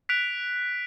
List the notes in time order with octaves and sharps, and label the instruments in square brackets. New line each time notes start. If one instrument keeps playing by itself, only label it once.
[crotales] F#6 B6 D7 F7